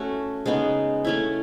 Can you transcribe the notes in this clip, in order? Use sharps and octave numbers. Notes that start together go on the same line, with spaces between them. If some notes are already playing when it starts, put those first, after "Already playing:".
Already playing: A3 C#4 F#4
C#3 G#3 B3 D#4
A3 C#4 E4